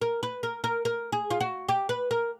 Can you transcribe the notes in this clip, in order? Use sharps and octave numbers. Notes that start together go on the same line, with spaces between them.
A#4
B4
A#4
A#4
A#4
G#4
F4
F#4
G4
B4
A#4